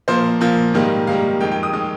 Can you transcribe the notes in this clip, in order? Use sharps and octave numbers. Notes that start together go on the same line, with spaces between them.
A#2 F3 A#3 C5
A#2 F3 A#3
G#2 D#3 G3 A#3
G#2 D#3 G3 A#3 F5
F2 D#3 G#3 G5
G5
D#6
D#3 G#3 D#6